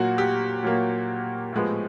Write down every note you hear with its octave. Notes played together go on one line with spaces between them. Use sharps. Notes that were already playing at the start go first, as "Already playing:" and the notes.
Already playing: A#2 F#3 A#3 F#4
G4
A#2 F#3 A#3
A2 F3 G#3 B3